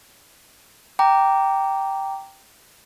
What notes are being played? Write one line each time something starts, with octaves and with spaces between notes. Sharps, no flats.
G5 A#5 D6